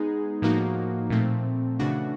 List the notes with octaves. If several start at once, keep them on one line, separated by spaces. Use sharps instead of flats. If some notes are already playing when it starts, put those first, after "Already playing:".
Already playing: G#3 B3 D#4 G#4
A2 F3 A#3 D#4 F#4
A#2 F3 A3 C4
C#3 E3 A3 D4 F#4